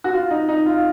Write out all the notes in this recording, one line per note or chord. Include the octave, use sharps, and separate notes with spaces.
F#4
F4
D#4
D#4
F4